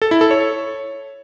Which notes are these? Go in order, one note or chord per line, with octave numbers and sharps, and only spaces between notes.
A4
E4
A4
C#5